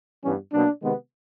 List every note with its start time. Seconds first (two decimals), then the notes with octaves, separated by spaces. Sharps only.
0.23 G2 E3 G3 B3 C#4
0.52 B2 F#3 A#3 D4
0.82 C3 D#3 G#3 B3